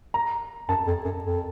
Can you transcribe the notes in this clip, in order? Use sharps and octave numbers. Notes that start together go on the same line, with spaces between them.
A#5
F#2 A5
F2
F#2
F2